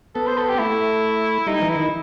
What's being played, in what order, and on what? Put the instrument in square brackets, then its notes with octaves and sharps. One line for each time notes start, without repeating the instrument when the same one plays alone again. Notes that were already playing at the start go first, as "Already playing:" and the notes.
[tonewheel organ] B3 [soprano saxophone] A4
[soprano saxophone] C5
A4
G4
[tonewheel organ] A3 [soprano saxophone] E4
[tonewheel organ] G3 [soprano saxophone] D#4
[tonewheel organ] E3
[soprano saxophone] E4
[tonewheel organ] D#3